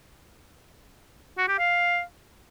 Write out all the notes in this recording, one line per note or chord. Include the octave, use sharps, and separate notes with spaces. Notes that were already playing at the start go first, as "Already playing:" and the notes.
F#4
G4
F5